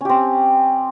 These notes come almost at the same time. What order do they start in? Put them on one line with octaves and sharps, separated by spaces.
C#4 G4 C4